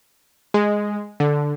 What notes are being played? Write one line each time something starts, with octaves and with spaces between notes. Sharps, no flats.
G#3
D3